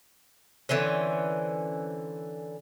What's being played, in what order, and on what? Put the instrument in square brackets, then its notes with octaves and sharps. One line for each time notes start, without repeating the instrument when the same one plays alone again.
[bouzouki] D3 E3 C4 C#4